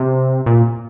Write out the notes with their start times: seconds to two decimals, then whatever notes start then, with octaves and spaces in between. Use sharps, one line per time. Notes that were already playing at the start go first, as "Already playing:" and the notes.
Already playing: C3
0.46 A#2